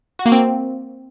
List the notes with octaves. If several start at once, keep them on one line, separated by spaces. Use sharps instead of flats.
F#4
A#3
C4